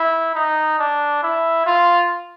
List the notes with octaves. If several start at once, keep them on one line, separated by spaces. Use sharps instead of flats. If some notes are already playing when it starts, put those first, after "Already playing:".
Already playing: E4
D#4
D4
E4
F4